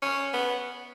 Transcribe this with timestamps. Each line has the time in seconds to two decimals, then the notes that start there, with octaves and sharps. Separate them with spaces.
0.02 C#4
0.34 B3